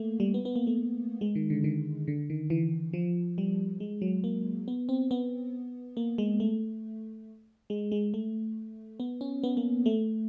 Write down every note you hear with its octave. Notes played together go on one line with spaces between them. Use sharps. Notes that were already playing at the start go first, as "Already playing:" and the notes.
Already playing: A3 A#3
G3
B3
B3
A#3
A3
G#3
D#3
D3
D#3
D3
D#3
E3
F3
G3
G#3
F#3
A#3
B3
C4
B3
A#3
G#3
A3
G#3
G#3
A3
B3
C#4
B3
A#3
A3